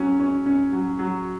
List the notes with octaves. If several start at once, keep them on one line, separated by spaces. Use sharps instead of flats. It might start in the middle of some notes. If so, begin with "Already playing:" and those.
Already playing: F#3 C#4
C#4
C#4
F#3
F#3